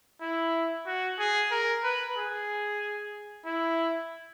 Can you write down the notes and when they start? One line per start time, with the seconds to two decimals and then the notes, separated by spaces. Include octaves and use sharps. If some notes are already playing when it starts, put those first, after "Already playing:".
0.21 E4
0.86 F#4
1.19 G#4
1.51 A#4
1.84 B4
2.16 G#4
3.46 E4